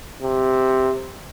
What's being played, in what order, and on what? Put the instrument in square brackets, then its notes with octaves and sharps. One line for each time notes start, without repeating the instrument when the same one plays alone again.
[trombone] C3